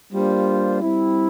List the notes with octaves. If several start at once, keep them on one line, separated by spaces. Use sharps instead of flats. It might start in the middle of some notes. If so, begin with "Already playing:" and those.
G3 A#3 D4 F4 C5
G3 C4 E4